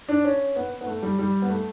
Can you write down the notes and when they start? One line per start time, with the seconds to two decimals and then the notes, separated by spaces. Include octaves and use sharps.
0.09 D4
0.24 C#4
0.56 B3
0.81 B3
0.87 A3
1.03 G3
1.19 G3
1.42 B3
1.50 A3